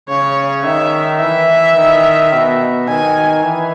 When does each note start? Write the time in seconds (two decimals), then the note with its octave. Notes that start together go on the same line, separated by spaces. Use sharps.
0.09 C#3 C#5
0.65 D#3 E5
1.21 E3 E5
1.77 D#3
2.33 B2
2.88 D#3 G#5
3.44 E3